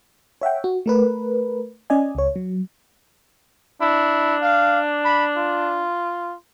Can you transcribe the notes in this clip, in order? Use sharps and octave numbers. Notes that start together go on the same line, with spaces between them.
C#5 E5 F#5 G5
F#4
A3 A#4 B4
C#4 D5 D#5 G#5
C#2 C#5
F#3
D4 E4
F5
B5
F4